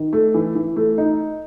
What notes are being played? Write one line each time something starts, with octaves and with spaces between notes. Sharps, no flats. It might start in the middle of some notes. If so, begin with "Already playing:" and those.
Already playing: D#3
A3
E3
E3
A3
D#4